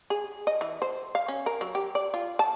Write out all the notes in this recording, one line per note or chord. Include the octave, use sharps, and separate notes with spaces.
G#4
D#5
E3
C5
F5
C#4
A#4
F#3
G4
D5
F4
A5